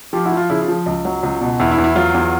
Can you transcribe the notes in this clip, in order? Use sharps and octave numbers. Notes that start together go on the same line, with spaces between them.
F3 F4 G4
E4 F#4
F3
F4
C#3 E4
F4
F3
C#2
F#3
C#2
B2
E2 E4
E4
E2
E4
F#3 F4
E2